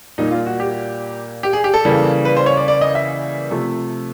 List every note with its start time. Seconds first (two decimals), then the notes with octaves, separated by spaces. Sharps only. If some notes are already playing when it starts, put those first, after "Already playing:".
0.18 A#2 G3 A#3 D#4
0.31 F4
0.46 F#4
0.60 G4
1.43 G4
1.53 G#4
1.64 G4
1.74 A4
1.85 C#3 E3 G3 A#3
2.25 B4
2.37 C5
2.46 C#5
2.57 D5
2.68 D5
2.81 D#5
2.95 E5
3.51 C3 F3 A3